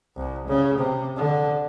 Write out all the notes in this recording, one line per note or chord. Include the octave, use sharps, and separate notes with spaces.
C2
C#3
C3
D3